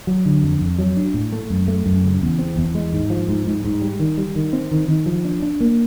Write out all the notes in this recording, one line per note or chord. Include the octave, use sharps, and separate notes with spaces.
F#3
D3
F2
F2
F#3
D4
A2
A3
F#2
A3
F#2
C#3
E2
C4
E2
G#3
G#2
F3
G#2
G#2
G#2
G3
D#3
G3
D#3
C4
D#3
D#3
F3
D4
D4
A#3